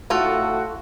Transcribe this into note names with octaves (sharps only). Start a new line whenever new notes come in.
G#1 A2 A3 F4 F#4 A4